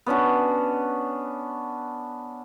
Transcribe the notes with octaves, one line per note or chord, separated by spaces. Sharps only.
B3 C#4 D4 F#4